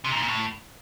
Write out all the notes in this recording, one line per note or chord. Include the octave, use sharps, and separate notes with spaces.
C3
A#2
G#2
A#2
A2